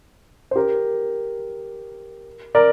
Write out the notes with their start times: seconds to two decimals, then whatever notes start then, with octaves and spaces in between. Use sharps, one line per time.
0.51 C5
0.56 G4 A#4
2.55 A#4 D5